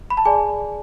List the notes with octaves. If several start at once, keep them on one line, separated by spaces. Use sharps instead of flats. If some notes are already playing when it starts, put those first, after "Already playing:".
B5
A5
G#4 D5 G#5